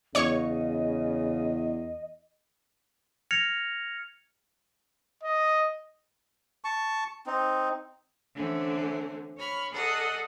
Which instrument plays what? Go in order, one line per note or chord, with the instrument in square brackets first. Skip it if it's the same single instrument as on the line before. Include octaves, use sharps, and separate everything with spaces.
[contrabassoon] E2 [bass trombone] C#3 [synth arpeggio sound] C#5 C#6 [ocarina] D#5
[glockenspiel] F6 G#6 A#6 C#7 F7
[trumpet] D#5
[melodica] A5 C#6
C4 D#4
[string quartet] D3 E3 A3 C4 C#4
C#5 B5 C#6 F6
G#4 A4 D5 D#5 F#5